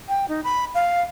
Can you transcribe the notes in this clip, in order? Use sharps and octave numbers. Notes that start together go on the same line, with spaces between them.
G5
D#4
B5
F5